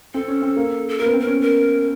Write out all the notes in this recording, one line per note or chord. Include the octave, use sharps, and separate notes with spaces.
C4 A4
C#4
C4
A#3
A4
A#3 A#4
B3
C4
A#4
C#4
A#4